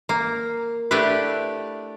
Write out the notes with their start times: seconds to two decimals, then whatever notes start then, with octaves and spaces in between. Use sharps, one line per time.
0.09 A#3
0.91 A3 D4 E4 G4 B4